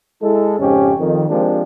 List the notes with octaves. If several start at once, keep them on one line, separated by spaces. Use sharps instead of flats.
G#3 E4 A4
F2 G#2 C#3 F3 C#4 G4
F2 D#3
F3 G#3 A#3 C4 D4 G4